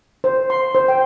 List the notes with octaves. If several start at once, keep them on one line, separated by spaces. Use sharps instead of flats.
C5
C6
C5
G5